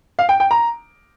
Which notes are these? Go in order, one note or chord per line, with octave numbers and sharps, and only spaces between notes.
F5
G5
G5
A#5